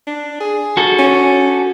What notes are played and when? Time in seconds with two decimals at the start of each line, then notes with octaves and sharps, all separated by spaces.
0.07 D4
0.40 G#4
0.77 F#4 A4
0.99 C#4